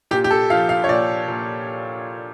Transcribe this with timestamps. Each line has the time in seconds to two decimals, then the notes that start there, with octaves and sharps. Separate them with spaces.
0.11 A#2 G4
0.24 G4
0.31 A4
0.50 F3 F5
0.69 F5
0.84 C#5
0.89 A#2 D5
1.28 A#2